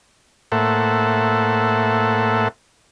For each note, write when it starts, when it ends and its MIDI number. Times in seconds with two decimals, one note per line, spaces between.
0.52 2.48 45
0.52 2.48 58
0.52 2.48 69
0.52 2.48 72
0.52 2.48 76
0.52 2.48 78